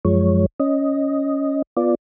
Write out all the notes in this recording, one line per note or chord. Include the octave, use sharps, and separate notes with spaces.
F#2 F3 G#3 C#5
C#4 D#5
B3 F4 D5